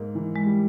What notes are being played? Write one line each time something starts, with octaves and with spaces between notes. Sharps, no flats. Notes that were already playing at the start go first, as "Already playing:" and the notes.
Already playing: G#2 A#3
E3
G#3
G3